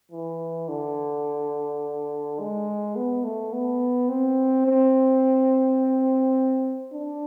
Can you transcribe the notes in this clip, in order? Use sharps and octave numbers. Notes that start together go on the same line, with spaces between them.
E3
D3
G#3
B3
A3
B3
C4
C4
D4